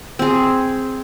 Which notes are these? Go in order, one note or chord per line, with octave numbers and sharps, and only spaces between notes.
C4 G#4